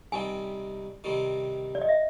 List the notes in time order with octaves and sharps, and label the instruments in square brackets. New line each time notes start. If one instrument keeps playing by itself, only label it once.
[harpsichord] C3 D#3 G3 [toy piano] G#5
[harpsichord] C3 D#3 G3
[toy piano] D5
D#5
E5